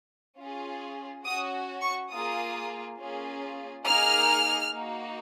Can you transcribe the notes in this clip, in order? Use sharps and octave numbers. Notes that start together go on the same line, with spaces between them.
C#4 F4 G#4
C#4 F#4 D#6
C#6
A#3 F4 G#4 D#6
A#3 C#4 F4 G#4
A#3 D#4 G#4 F6
A#3 D#4 F#4